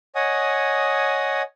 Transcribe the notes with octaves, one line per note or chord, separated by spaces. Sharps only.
C#5 D#5 F#5 G#5 D#6